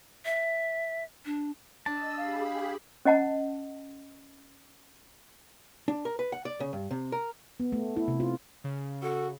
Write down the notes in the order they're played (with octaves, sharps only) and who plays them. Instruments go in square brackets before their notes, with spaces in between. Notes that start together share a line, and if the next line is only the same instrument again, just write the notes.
[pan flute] E5
D4
[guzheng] D4 [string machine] D#5 E6 [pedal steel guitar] A5
[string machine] G4 G#4 B5 [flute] F5
[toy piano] C#4 D#5 F#5 A5
[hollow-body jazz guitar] D4
A#4
B4
F#5
D5
C#3
G2
C3
A#4
[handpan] B3
A3
E4
C3
F4
[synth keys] C#3
[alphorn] F#4 [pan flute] A4